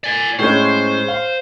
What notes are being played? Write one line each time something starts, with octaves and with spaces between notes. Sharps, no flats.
D5 G#5
A2 G#3 C#4 C5
F5